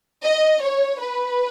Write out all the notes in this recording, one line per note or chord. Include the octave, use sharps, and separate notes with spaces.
D#5
C#5
B4